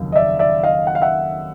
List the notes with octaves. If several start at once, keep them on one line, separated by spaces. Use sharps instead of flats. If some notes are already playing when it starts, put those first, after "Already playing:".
Already playing: F1 D#2 C#3 F#3
D#5
D5 E5
D5 E5
D#5 F5
F#5
F5
E5 F#5